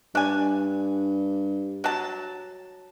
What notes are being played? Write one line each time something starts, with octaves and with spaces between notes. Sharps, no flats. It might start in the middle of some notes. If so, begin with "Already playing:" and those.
G2 D4 G#5
F#3 A5